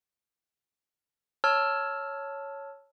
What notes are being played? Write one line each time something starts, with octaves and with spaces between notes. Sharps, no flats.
C#5 A5 E6 F6